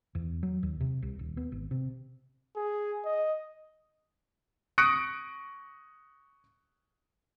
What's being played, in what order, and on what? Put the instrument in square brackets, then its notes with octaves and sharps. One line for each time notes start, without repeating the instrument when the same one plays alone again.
[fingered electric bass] E2
F#3
D#2
C3
C2
D#1
B3
G#1
C3
[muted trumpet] G#4
D#5
[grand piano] C#6 D#6 F#6 A#6 C#7 D7